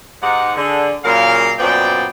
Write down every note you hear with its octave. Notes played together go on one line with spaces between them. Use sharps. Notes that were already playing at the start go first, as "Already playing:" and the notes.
G#2 D#4 G4 F#5
D3 G#4
A#2 C#3 F#3 A#4 F5
F#2 A#2 B3 C5 D5 G5